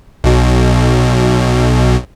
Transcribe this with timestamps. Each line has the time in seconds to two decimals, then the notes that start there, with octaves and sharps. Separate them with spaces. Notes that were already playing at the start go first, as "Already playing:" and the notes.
0.24 B1 B2